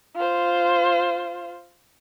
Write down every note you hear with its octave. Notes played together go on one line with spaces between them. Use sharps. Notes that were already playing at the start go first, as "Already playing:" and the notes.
F4 C5